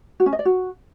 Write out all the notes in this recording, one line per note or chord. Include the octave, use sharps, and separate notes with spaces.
F#4
C#4
D#5
D5
F#4